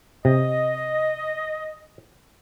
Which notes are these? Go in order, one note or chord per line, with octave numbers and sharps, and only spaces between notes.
C3 D#5